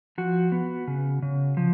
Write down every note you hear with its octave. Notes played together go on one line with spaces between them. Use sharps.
F3 F#4
B3
C#3
C#3
F3